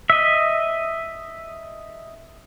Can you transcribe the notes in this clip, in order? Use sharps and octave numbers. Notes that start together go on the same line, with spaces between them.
D#5 E5